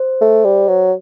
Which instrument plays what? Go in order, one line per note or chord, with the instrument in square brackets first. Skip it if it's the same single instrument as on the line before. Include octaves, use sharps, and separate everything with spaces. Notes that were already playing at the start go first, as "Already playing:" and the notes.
Already playing: [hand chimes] C5
[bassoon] A3
G3
F#3